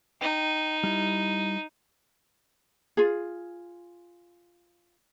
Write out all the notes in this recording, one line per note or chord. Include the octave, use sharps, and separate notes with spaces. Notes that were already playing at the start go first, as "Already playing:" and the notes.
D#4 G5
G3 E4
F4 G#4